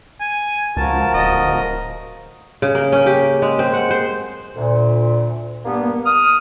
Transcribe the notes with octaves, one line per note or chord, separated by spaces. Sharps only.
G#5
C#2 F3 F#4 A#4 A5
D1 D#5
C#3
A#3
C#4
G4
G#3
C4
F#5
C5
D2 A#2
G2 A#3 B3
D#6 F6